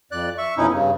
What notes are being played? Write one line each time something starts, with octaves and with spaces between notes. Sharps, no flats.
F2 D5 F#6
E5 C#6
F2 B2 C#4 D#4 E4
G2 C#3